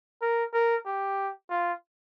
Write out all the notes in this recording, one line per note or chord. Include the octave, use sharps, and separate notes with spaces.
A#4
A#4
G4
F4